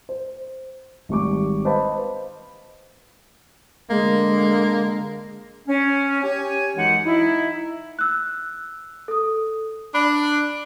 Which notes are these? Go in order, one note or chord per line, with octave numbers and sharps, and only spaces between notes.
C5
G#1 G3 C#6 D6
B4 C5 D#5 F5 A5 B5
D3 G#3 A#3
C#4
G4 C#5 G#5
F#2 E3 G#3 D#4 F#5
D#4 E4
E6 F#6
A4 D#6
D4 B5